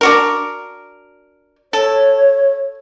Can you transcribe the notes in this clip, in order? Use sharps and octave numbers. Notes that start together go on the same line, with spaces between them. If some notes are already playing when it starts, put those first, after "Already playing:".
D4 F#4 A#4
A4 C#5